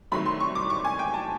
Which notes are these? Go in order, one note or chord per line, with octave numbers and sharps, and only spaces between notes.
C2 C3 D#3 F#3 A3 B5
C6
C#6
D6
C#6
G#5
G5
A5